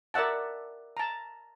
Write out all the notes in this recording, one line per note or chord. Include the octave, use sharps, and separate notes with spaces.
A#4 D5 E5 F#5 A5
A5 A#5